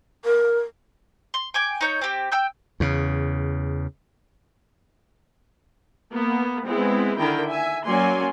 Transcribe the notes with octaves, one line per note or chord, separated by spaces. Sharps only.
A#4
C6
G5 G#5 D6
D#4 C#5 G6
C4 G4
G5 E6 G6
E2 C#3
A#3 B3
G#3 B3 C4 E4 B4
D3 D#3 E4 A#4 G5
E5 G#5
F#3 A#3 C#4 D5 G#5 C6